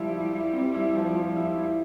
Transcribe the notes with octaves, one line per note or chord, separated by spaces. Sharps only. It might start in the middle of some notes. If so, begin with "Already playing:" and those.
Already playing: F3 G3 E4
E4
E4
C4
E4
F3
F3
E4
E4